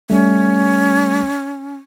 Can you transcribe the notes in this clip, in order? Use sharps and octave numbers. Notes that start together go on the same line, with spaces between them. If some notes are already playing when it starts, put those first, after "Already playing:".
G3 A3 C#4